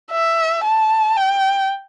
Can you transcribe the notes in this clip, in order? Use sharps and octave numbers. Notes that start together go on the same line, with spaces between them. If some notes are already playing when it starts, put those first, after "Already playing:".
E5
A5
G5